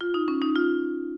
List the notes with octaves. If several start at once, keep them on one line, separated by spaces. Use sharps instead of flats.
F4
D#4
C#4
D#4
F4